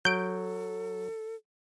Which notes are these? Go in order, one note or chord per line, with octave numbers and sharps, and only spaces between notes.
F#3 A4 G6 D7